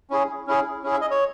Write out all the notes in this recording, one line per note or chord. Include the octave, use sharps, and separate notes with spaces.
C#4 E4 G#4
C#4 E4 G#4
C#4 E4 G#4
E5
D#5
C#5